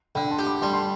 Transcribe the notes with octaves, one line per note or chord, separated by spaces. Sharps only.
D3 G5 B5
A5 C6
G4
B5 D6
G3 A5 C6
A5 C6